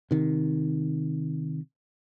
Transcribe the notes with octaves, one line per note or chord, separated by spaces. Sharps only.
C3 D#3